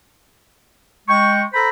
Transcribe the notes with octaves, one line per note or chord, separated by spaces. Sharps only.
G#3 G5 C#6
A4 C5 A#5 B5